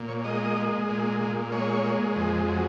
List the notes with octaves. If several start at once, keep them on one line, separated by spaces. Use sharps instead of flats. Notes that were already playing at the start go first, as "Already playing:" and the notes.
Already playing: A#2
C#5
G#3 D#5
G#3
A#2
A#2
G#3 C#5
G#3
F2
F#3